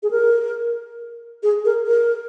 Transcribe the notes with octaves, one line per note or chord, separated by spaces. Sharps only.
G#4
A#4
G#4
A#4
A#4